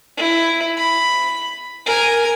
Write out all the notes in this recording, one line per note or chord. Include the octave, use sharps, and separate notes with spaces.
E4
B5
A#4 G#5